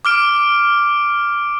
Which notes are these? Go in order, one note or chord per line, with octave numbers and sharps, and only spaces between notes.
D6 F6 D7